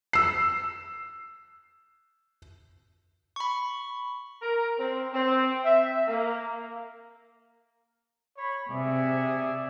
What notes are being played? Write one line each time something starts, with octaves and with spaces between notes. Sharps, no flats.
E6 C7
B5 C#6
A#4
C4
C4
E5
A#3
C#5 B5
C3 G#4 D5 E5